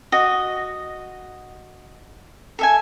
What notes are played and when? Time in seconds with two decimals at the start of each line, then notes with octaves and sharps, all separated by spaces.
0.12 F#4 D#5
2.59 A4 E5 G#5